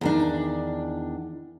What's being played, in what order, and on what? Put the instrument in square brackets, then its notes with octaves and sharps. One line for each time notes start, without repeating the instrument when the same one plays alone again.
[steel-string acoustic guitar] E2 D#3 D4